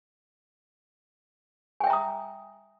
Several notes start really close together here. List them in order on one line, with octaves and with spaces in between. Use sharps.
G#5 G5 E5 A#5 D#6